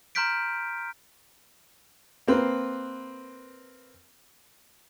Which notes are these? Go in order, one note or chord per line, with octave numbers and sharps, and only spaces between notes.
A#5 C6 F6 G6 B6 D7
A#3 C4 B4